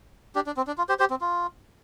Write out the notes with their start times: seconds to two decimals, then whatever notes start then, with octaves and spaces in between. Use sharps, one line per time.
0.35 D4 G4
0.47 D4
0.57 C4
0.67 D4
0.78 F4
0.89 G4 C5
0.99 G4 C5
1.10 C4
1.21 F4